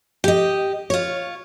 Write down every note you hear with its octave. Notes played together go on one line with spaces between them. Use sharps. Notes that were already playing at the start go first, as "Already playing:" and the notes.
G4 D#5
F4 C#5